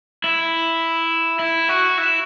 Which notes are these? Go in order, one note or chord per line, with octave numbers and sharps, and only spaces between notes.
E4
E4
F#4
E4